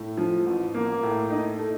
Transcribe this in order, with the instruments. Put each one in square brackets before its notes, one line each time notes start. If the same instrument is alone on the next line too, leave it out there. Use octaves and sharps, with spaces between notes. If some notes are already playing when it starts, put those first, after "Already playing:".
Already playing: [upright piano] A2
F3
A1
A#3
A2
D#4
A3